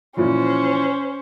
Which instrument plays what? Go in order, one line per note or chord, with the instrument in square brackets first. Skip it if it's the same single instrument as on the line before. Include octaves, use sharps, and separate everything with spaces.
[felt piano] A#2 E3 F3 [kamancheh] C#4 C5